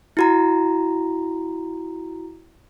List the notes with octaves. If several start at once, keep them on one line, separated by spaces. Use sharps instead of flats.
E4 F#4 A#5